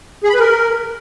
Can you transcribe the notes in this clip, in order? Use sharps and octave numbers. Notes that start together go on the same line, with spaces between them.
G#4
B5
B4
A#4